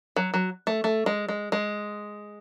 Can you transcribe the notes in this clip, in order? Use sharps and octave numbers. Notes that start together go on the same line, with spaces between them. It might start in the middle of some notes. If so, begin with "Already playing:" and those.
F#3
F#3
A3
A3
G#3
G#3
G#3